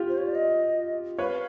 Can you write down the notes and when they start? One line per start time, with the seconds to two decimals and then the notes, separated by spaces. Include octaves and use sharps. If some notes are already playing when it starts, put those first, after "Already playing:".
Already playing: F4 G4
0.09 C5
0.18 C#5
0.27 D5
0.35 D#5
1.19 B4 C#5 F5